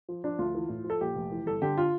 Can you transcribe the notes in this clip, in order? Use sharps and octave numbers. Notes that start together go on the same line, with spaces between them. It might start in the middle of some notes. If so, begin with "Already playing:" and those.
F3
F3 D4
D2 F4
E3
A2
F3
A4
A#1 G4
F1
E3
G1 A4
D3 G4
F4